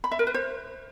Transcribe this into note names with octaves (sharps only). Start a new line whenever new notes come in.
B5
E5
A#4
B4
C5